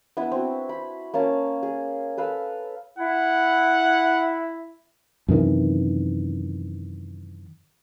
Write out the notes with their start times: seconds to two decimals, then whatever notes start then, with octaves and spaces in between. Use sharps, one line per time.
0.17 B3 D4 E4 E5
0.32 C4 F#4
0.69 B5
1.14 A#3 C#4 F5 A5
1.63 G#4
2.18 A4 B4 F5 E6
2.99 E4 F#5
5.28 F#2 C3 D#3 E3